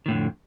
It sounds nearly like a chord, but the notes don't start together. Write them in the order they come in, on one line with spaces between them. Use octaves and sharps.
D#3 A2 D3 F2